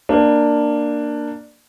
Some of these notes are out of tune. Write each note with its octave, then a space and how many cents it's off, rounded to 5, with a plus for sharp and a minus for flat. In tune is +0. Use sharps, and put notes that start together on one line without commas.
A#3 +0 D4 +10